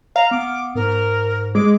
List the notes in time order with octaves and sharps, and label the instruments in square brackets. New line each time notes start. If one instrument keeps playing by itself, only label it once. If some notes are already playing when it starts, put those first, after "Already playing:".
[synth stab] F5 [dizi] A#5
[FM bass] B3 [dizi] D6
[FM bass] G#2 [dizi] A#4
[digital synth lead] G#3 [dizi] D6